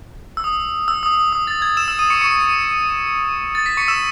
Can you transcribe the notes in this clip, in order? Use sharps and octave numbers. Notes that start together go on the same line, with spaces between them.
E6
D#6
E6
D#6
D#6
D#6
A6
G#6
E6 E7
E6 E7
D#6 D#7
C#6 C#7
C#6 C#7
A6
B6
C#6 C#7
E6 E7